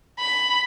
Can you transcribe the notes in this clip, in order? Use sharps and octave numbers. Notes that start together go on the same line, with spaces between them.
B5